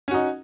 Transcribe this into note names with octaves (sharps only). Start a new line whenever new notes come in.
C#4 D#4 F#4